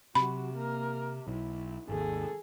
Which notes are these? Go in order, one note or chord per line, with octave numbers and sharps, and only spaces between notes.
C3 F#3 F#4 B5
A#3 A#4
B1 E4
G#1 D#2 G#4 A4